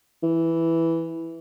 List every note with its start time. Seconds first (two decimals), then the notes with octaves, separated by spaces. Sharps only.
0.23 E3